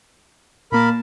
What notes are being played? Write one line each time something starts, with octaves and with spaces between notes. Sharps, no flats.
A#2 A#3 A#4 A5 B5